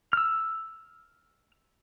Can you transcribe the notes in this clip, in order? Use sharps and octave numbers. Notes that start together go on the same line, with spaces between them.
E6 F6